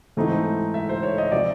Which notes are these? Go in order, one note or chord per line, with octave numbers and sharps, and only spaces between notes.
G#2 E3 A3 C4 D#4
E5
C5
C#5
D#5
C3 F3 D5